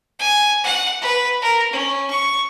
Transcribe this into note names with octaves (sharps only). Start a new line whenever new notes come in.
G#5
F#5
B4
A#4
C#4
C#6